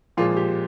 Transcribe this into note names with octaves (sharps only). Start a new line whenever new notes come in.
A#2 F3 G#3 F4
G4